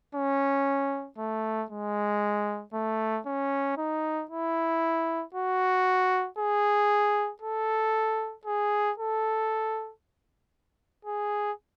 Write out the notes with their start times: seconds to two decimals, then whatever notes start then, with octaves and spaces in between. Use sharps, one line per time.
0.15 C#4
1.18 A3
1.70 G#3
2.74 A3
3.26 C#4
3.77 D#4
4.31 E4
5.34 F#4
6.38 G#4
7.41 A4
8.45 G#4
8.98 A4
11.05 G#4